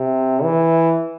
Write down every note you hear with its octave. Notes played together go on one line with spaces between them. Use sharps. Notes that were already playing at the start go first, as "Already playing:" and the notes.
Already playing: C3
E3